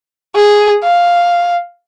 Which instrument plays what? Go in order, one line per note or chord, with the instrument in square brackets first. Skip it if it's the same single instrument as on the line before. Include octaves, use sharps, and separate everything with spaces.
[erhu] G#4
F5